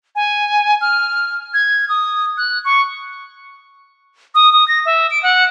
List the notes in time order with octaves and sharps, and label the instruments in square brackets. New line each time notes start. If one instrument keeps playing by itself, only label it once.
[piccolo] G#5
F6
G#6
D#6
F#6
C#6
D#6
D#6
A#6
E5
D7
F#5